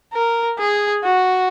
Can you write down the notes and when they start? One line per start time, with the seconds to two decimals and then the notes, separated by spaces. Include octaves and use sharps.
0.13 A#4
0.58 G#4
1.04 F#4